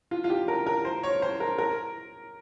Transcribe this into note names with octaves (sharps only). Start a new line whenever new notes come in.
F4
F4
G4
A#4
A#4
C5
C#5
C5
A#4
A#4